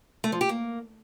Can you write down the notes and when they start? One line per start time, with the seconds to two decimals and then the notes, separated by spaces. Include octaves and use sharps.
0.24 A3
0.32 F3
0.41 G4
0.49 A#3